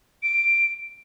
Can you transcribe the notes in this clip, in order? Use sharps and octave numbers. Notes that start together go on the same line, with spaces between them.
D7